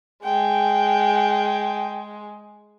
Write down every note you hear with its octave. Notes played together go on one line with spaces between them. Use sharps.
G#3 G5